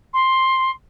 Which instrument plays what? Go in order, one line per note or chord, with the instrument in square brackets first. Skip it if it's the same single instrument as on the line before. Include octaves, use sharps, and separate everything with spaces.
[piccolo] C6